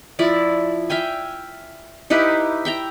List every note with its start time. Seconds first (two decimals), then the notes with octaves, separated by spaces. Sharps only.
0.19 F3 E4 D5
0.90 E5 F5 G5 G#5
2.10 D#4 E4 G4 B4
2.65 E5 G5 A#5